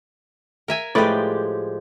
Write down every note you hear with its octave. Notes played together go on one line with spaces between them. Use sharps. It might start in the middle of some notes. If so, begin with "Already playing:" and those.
A#4 E5 G#5
A2 F3 G#3 G4 B4 D5